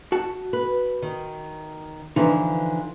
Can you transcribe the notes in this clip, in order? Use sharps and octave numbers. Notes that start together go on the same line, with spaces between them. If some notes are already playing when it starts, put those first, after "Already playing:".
F#4 A5
B4
D#3
D3 E3 F3 D4 D#4